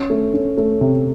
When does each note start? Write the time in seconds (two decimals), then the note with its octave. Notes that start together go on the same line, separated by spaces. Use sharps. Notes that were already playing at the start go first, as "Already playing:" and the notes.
Already playing: C#4
0.10 A3
0.34 C#4
0.58 A3
0.81 C3